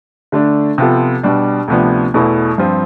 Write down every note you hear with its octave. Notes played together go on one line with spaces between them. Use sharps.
D3 A3 D4
C3 F3 B3 F4 A4
B2 G3 D4
D2 C3 F3 B3 D4
E2 B2 A3 E4
G2 F3 C4 F4